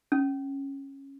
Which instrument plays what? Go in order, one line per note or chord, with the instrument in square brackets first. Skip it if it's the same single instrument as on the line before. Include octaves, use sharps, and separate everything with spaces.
[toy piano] C#4